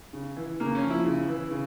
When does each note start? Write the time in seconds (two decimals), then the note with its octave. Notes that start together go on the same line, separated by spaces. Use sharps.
0.13 C#3
0.37 E3
0.60 C#3 A#3
0.75 C#4
0.83 F3
0.90 E4
1.05 C#3
1.28 E3
1.51 C#3